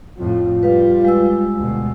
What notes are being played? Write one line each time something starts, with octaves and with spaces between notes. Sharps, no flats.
F2 A2 F4
G3 B4 F5
G#3 E6
D2 B2